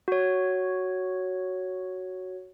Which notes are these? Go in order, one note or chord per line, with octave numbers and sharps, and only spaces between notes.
F#4 C#5